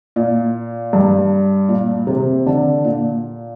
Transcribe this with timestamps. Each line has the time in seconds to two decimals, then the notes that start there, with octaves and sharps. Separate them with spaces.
0.16 A#2
0.93 G2
1.69 A#2
2.07 C3
2.46 D3
2.85 A#2